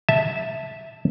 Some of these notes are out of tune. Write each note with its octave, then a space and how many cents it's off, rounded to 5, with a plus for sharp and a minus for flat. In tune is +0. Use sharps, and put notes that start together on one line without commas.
E5 -10 A5 +0